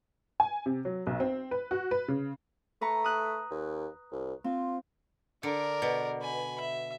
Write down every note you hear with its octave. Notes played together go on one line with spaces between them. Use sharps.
G#5
C3
F#3
B1
C4
B4
F#4
B4
C#3
A3 B4 A#5 C#6
D#6 F#6
D#2
C2
C4 F4
D3 A#4 D5
B2
G#5 B5
E5